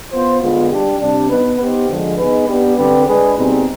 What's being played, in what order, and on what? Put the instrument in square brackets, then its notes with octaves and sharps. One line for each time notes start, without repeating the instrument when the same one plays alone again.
[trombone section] B3 F4 C5
D3 G#3 B3 F4
G3 D4 G4
C3 G3 D4
B3 D#4 B4
B3 D#4 G4 C5
D3 F3 G#3
B3 D#4 G#4 B4
B3 D4 G4
D3 G3 C4 G4 B4
G#3 D4 G#4 B4
B2 G3 C4 D#4 G#4